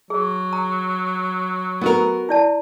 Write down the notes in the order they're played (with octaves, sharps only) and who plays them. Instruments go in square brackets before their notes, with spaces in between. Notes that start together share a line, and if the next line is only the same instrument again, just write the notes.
[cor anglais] F#3 [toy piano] G#4
[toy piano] A#5
[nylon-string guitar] B3 F#4 A#4
[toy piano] E4 D5 A5